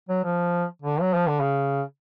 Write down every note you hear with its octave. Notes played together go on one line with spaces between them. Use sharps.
F#3
F3
D3
F#3
F3
D3
C#3